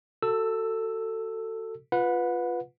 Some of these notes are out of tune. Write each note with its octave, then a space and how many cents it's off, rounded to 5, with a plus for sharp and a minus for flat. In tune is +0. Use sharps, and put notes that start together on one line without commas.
F#4 +15 A4 +20 E6 +0
F4 +0 B4 +0 F#5 -35